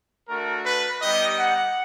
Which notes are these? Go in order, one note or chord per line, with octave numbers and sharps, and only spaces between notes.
A3 D4 F#4 A#4
B4
G3 B3 D#4 G4 D#5
F#5